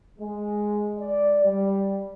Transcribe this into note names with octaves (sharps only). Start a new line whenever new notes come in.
G#3
D5
G3